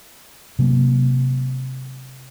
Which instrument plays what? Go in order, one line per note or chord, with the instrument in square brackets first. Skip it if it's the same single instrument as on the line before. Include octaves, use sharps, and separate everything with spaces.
[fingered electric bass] C3 F#3 A#3